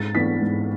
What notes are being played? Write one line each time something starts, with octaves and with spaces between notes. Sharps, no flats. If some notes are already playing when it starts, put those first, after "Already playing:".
Already playing: G#2 A6
E3 B3 D4 B6
G#2